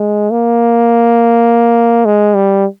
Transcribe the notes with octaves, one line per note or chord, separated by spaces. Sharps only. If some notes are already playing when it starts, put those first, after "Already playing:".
Already playing: G#3
A#3
G#3
G3